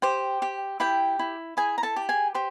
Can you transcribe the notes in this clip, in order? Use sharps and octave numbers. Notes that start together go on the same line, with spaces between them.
G4 C5 G5
G4
E4 G4 G5
E4
E4 G#4 G#5
A#5
A4 A5
G4
G#4 G#5
G4 C5